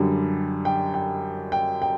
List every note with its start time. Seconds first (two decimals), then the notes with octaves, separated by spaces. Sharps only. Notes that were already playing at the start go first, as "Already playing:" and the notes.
Already playing: F#2 D3 G3
0.65 G5
0.94 G5
1.52 G5
1.82 G5